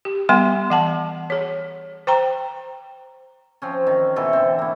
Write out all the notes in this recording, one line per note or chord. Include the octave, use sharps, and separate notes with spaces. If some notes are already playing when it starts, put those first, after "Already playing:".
G4
G3 B3 F#5 C6
E3 F#5 A5
G#4 C#5
C5 G5 A#5
F3 C4 C#4
D#3
B2 E3 A4 C#6
D3 C4
A#3 E4